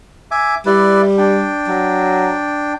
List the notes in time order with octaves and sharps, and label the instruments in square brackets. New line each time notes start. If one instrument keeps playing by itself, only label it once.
[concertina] E5 G#5 D6
[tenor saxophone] G3 [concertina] E4 B4 D5
[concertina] D4 G5
[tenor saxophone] F#3